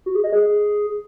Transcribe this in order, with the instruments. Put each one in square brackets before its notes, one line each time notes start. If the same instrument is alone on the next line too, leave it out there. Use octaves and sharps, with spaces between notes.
[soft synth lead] F#4
G#4
D#5
G#4